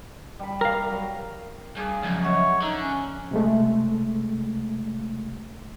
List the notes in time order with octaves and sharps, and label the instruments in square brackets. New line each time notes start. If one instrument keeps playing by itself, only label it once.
[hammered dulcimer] G3 B5
[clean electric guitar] A#4 F5
[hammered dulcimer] F#3
[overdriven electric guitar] G2 [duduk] G#4
[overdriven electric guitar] C#2 F#2 [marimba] F3 G#6
[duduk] C#5 [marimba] D#5 E5 F#5
[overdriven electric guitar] D3 [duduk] D#4
[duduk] C#4
[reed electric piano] C3 G#3 A3